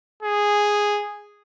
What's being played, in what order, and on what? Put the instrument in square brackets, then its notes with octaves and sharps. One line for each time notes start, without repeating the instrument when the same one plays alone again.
[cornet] G#4